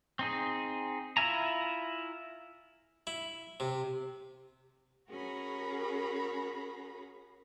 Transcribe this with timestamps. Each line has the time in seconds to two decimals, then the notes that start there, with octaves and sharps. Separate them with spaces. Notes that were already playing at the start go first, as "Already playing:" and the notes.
0.19 C4 D#4 G#4
1.17 E4 F4 E5 G#5 A#5
3.07 E4
3.60 C3
5.09 C#4 F#4 G#4 A#4 A#5 B5